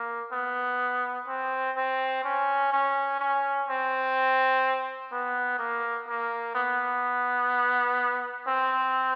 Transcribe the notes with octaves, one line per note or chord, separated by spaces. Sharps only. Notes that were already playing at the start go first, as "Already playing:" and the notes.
Already playing: A#3
B3
C4
C4
C#4
C#4
C#4
C4
B3
A#3
A#3
B3
C4